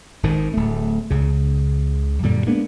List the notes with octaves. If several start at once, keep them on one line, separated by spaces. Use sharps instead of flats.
G#1 G#2 D#3
D1 A3
C#2 C#3
F#2 A#2 D3 G3
G#3 A#3 B3 D4